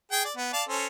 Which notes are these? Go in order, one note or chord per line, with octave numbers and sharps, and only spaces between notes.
G#4 G5
D5
B3
D5 F5 A5
C#4 A4 C5